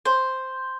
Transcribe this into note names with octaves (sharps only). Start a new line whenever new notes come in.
C5